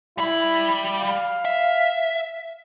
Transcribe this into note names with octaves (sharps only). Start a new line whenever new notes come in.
G3 E4 B5
F5
E5